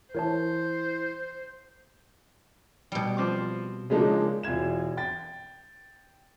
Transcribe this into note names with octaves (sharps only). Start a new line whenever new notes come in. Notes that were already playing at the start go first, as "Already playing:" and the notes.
E3 A#4 C5 C#5 A5
B2 G3
F3 C4 D6
C#3 F3 G#3 A#3 D4 D#4
E1 E3 F4 G#6 E7
G5 A6